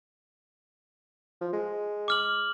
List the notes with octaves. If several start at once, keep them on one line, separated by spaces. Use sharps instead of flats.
F3
G#3
D6 F6 F#7